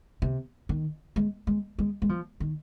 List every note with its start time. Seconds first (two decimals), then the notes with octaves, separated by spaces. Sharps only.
0.22 C3
0.69 D#3
1.16 G#3
1.47 G#3
1.79 G#3
2.02 G#3
2.09 F3
2.40 D#3